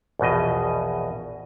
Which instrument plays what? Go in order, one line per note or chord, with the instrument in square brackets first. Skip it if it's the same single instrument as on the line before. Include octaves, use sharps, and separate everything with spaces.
[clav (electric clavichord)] A#1 E2 B2 D#5